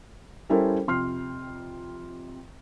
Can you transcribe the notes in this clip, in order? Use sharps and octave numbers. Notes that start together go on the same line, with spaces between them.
G3 C#4 E4 A4 A#4 C5
F2 C3 C6 F6 C7